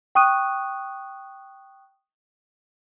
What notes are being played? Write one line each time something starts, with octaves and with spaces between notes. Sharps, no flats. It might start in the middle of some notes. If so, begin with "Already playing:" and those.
G5 C#6 D#6 F#6 D#7